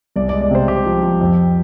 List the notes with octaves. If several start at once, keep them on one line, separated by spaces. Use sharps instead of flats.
C2 D5
D5
G#3
D5
C3 C5
C3 G4
F3
F3
F2